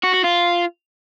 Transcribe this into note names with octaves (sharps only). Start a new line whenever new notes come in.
F#4
F#4
F4